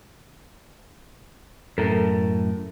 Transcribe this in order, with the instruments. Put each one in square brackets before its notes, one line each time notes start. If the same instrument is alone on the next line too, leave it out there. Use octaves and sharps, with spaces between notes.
[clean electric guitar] F#2 A2 [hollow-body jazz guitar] A4 A#4